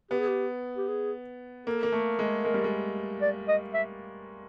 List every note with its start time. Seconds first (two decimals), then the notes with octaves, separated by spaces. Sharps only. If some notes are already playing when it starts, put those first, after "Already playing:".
0.11 B3 G4
0.19 G#4
0.28 G4
0.76 G4
0.89 G#4
1.67 A#3 A4
1.83 A#3
1.92 A3
2.19 G#3
2.44 G#3 A#4
2.54 G3
2.64 G#3
3.22 D5
3.48 D#5
3.74 E5